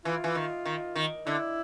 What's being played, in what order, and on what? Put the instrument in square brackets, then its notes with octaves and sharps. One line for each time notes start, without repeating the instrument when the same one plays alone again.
[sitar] E3 [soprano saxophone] F4
[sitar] E3
D#3
D#3
D#3
[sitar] D3 [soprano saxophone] E4